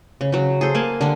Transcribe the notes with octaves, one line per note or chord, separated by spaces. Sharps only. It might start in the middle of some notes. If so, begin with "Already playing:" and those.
C#3
C#3 F#3
G#4 A4 C5
A#3 G#5 A5
D3 G3 D4